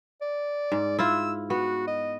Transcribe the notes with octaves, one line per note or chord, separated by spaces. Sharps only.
D5
G#2
E4 F4 E6
B3 F#4
D#5